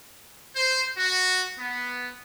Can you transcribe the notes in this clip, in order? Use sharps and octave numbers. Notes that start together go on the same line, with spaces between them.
C5
F#4
B3